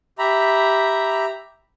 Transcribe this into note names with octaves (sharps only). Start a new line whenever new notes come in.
G4 E5 A#5 B5